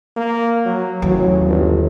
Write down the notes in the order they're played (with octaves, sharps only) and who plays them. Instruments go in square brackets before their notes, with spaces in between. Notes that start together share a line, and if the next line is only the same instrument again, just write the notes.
[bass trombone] A#3
F#3
[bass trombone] A1 [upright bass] D#2 [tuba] F#3
[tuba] G1